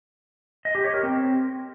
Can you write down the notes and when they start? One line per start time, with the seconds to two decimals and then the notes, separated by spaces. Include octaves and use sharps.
0.65 D#5
0.75 G4
0.84 C#5
0.94 A#4
1.03 C4